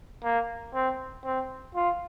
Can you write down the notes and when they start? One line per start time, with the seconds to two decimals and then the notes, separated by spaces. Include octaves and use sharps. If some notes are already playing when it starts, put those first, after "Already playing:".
0.24 A#3
0.74 C4
1.24 C4
1.75 F4